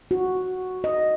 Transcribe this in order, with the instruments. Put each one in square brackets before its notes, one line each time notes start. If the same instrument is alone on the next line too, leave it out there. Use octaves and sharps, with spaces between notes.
[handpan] F#4
D#5